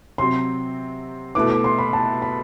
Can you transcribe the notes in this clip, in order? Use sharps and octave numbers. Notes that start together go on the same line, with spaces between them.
C3 F#3 C4 C6
B2 A3 E4 B4 D6
D6
C6
B5
A5
B5